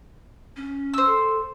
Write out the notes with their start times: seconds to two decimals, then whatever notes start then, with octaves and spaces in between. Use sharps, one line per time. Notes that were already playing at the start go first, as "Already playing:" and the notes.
0.57 C#4
0.94 C5 E6
1.06 A4